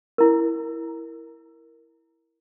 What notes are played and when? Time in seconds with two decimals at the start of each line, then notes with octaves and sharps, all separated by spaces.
0.18 E4 A#4